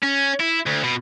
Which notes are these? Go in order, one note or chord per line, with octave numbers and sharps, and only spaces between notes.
C#4
E4
D2
B2